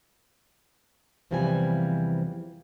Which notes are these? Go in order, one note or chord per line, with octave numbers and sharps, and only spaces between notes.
E2 C3 E3 F3 G3 G#5